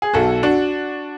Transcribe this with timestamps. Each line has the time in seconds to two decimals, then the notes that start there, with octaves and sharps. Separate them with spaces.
0.02 G#4
0.14 B1 F#4 A4
0.43 D4 F#4